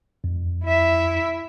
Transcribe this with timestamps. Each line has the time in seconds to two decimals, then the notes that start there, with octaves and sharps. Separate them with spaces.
0.24 F2
0.65 E4 E5